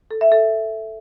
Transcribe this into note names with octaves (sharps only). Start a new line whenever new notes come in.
A4
E5
A4